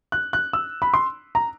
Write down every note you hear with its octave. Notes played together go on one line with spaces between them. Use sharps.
F#6
F#6
E6
B5
C6
A#5